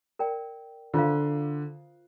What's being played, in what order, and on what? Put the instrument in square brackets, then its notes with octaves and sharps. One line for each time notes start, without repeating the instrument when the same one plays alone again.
[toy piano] A#4 D5 G5
[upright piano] D3 [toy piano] F4 C5 F5